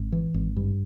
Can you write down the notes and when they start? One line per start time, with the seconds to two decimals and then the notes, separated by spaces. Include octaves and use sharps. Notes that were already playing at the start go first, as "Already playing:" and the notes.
Already playing: G#1
0.12 E3
0.34 G#1
0.56 G2